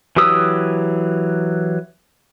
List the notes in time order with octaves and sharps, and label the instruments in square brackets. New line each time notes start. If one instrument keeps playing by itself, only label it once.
[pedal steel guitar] E3 F#3 G4 D#6 E6